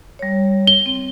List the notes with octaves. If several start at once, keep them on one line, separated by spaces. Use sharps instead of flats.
G3 C#5
G7
C4